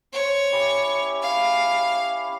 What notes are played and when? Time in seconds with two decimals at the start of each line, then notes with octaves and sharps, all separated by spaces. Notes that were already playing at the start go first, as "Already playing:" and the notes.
0.13 C5 C#5
0.52 C#4 E4 G4
1.22 F5